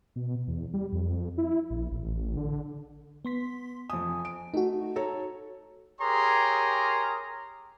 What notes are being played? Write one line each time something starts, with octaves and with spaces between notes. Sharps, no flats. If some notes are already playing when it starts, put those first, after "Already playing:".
B2
E2
G3
F2
E4
A#1
A1
D3
B3 C6 B6
F2 G#5 D#6
D7
A3 D#4 F#4
A4 C#5 A#5
G4 G#4 A#4 C#5 A#5 C6